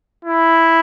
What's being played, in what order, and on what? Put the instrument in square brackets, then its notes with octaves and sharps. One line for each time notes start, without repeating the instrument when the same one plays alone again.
[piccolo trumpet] E4